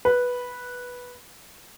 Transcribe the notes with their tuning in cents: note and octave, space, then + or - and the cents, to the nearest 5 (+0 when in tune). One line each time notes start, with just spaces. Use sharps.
B4 -5